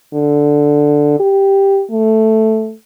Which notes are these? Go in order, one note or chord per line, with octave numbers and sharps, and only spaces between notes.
D3
G4
A3